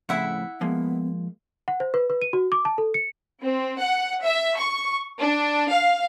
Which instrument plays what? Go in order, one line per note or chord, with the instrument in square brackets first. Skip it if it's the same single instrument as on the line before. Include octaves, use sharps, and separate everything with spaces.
[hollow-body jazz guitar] F2 A2 C#3 [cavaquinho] E4 E5 F#5
[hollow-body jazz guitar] F3 G#3 A#3 [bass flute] B3
[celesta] F#5
C5
B4
B4
D#7
F#4
D6
A5
A4
C#7
[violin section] C4
F#5
E5
C#6
D4
F5